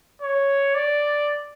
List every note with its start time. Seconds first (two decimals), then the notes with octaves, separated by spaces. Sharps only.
0.22 C#5
0.75 D5